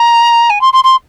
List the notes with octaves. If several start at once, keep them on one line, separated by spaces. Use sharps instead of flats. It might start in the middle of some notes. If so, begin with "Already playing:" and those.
Already playing: A#5
G#5
C6
C6
C6